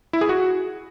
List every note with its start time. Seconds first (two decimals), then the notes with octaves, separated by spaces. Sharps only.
0.13 E4
0.21 G#4
0.29 F#4